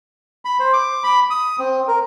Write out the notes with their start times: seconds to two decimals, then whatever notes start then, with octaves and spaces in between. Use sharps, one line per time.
0.45 B5
0.60 C5
0.73 D6
1.04 B5
1.30 D#6
1.59 C4
1.88 A#4